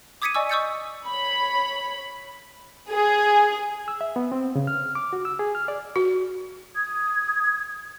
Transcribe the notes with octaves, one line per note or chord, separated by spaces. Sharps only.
D6 D#6 G#6 B6 C#7 D#7
D5 D#5 G#5 C#6 E6
C#6 D#6 E6 G6 A6 C#7
C#5 B5
G#4
E6
E5
B3
C4
C#3
F6
D6
F#4
E6
G#4
F6
D5
F#4
D#6 G#6